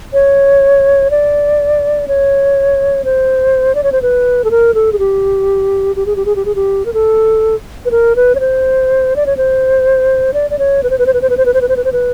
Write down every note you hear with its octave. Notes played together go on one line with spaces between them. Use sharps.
C#5
D5
C#5
C5
D5
C#5
C5
B4
A4
A#4
A4
G#4
G4
G4
G#4
G4
G#4
G4
G#4
G4
A#4
A4
B4
A#4
B4
C#5
C5
D5
C#5
C5
D5
D5
C#5
B4
C5
B4
C5
B4
C5
B4
C5
B4
C5
B4
C5
B4
C5
B4